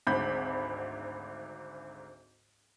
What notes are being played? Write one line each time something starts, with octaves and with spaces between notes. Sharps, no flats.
G#1 D2 G#2 B5 G6